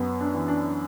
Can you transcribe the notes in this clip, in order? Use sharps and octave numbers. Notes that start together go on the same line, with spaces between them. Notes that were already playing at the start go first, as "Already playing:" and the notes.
Already playing: F#2 B3
D4
E3
D4